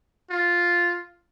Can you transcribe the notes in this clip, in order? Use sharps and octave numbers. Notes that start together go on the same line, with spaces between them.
F4